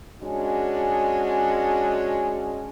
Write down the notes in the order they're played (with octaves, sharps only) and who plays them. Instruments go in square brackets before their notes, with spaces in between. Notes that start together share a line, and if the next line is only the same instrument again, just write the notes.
[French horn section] G#3 C#4 D4 F#4